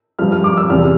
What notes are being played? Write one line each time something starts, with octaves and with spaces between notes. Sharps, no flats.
G2 F3 F6
F6
D6
E6
E2 C3 F3 F6